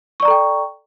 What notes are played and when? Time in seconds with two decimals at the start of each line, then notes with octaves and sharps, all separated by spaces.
0.20 C#6
0.22 D5
0.25 A#5
0.28 A4
0.30 G5